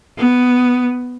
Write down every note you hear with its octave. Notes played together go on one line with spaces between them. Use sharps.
B3